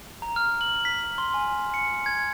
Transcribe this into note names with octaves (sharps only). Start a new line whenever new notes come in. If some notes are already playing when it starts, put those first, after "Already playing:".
A#5
F6
F#7
B6
C6
G#5
C#7
G#6